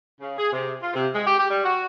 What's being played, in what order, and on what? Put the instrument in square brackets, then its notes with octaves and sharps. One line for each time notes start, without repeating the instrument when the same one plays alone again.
[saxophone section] C#3
G#4
C3
F4
C3
G#3
G4
G4
G3
F#4